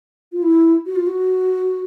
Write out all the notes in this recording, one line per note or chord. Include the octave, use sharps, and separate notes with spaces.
F4
E4
F#4
F4
F#4